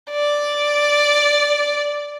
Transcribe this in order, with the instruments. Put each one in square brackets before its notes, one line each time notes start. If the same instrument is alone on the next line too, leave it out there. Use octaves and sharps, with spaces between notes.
[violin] D5